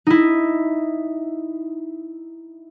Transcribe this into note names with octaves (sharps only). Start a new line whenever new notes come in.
D#4 E4